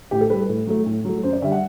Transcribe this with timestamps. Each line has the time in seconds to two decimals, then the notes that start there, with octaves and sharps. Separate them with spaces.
0.11 A2 G4
0.21 A4
0.30 G3 B4
0.40 A4
0.49 A2
0.67 F#3 A3
0.86 A2
1.04 F#3 A3
1.23 F#2 C5
1.33 D5
1.42 D3 G3 E5
1.52 F#5